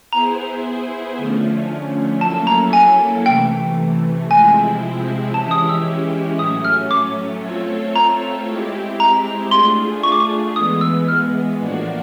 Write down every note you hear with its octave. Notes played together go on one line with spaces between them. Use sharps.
B3 E4 G#4 C5 A#5
D3 F3 A3 C#4
F#3 A#3 C#4 E4 A4 A5
A#5
G#5
C3 E3 A3 G5
C3 F3 G#3 C4 E4 G#5
E3 G#3 C#4 E4 G4 A5
D#6
E6
A2 F#3 A3 C#4 D#6
F6
D6
A3 C4 F4 A4 C#5
A#5
G#3 C4 E4 G4
A#5
A3 D4 F4 G#4 C6
C#6
D6
C#6
E3 G#3 B3 D#6
E6
F6
A2 F3 A#3 D4 F#4